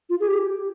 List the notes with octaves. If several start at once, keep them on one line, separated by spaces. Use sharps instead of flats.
F4
G#4
G4